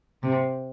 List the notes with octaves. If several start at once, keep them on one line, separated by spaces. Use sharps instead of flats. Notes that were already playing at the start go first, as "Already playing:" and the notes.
C3